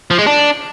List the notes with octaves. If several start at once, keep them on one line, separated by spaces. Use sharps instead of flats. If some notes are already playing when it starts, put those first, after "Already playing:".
F3
G#3
D4